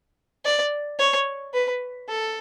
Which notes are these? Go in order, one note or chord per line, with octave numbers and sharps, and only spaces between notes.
D5
C#5
B4
A4